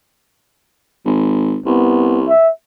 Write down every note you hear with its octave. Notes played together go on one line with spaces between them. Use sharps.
G#1
C2 B3
E5